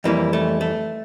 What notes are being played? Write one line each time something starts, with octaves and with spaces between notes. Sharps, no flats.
F2 E3 G3 A#3
A3
A3